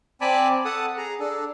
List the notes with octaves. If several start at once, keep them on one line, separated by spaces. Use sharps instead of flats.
C4 D5 G#5 A5 B5 D6
A4 F#5 A5 D#6
G#4 A#5
D4 A4